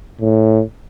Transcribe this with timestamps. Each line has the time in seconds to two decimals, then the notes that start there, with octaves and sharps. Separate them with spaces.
0.21 A2